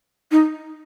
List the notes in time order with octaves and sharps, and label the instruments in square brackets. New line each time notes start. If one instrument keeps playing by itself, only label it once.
[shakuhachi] D#4